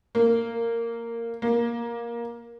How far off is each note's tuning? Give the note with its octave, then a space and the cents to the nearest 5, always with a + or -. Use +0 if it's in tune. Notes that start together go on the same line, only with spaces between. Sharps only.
A#3 -10
A#3 +15